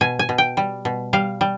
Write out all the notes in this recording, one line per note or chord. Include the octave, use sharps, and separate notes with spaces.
B2 G#5
G#5
B2
G5
G3
B2
G3 F5
G3